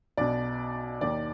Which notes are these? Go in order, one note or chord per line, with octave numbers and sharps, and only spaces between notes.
B1 B2 D5
D#2 D#3 D5